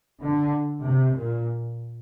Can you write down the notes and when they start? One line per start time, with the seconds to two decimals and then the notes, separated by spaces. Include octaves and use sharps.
0.23 D3
0.84 C3
1.15 A#2